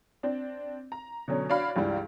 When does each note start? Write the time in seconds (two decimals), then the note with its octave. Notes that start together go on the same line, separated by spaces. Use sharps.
0.23 C4 D4
0.92 A#5
1.28 B2 D3 F#3 C#4
1.50 D4 F#4 C#5 F5 B5
1.76 C#2 G2 E3 G3